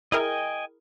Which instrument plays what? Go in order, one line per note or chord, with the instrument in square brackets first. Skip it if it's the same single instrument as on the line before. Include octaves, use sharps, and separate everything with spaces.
[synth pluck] E4 G#4 A#4 [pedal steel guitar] D#5 G5 G#5